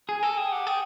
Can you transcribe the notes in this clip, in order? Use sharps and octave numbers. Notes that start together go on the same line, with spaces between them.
G#4 G#5
A4
G#4 G5
G4 F#5
G#4 G5